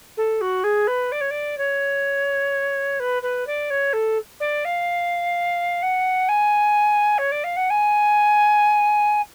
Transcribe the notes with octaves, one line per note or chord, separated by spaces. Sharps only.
A4
F#4
G#4
B4
D5
C#5
D5
C#5
B4
B4
D5
C#5
A4
D5
F5
F#5
G#5
C#5
D5
F5
F#5
G#5